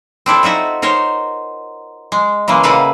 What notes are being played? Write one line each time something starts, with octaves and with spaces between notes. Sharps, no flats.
C4 D4 E4 A4
D#4 F4 F#4 E5
D#4 A#4 C5 C#5
G#3
C#3 E3 G#3 A#3
C#3 A#3 F#4 A4 B4 F5